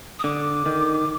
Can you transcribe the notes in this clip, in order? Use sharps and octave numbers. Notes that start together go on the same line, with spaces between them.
D#6
D3 D6
D#3